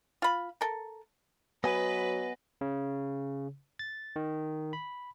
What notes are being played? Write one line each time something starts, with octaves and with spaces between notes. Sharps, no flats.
F4 B5
A4 A#4
F#3 B3 B4 D#5 G#5
C#3
A6
D#3
B5